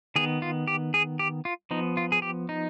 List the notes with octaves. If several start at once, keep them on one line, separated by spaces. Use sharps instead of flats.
D#3 B3 G#4
F4
G4
G#4
G4
F4
F3 B3 D#4
F4
G#4
G4
D#4